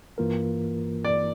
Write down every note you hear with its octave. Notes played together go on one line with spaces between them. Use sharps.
G2 E3 A#3 F4 A#4
D5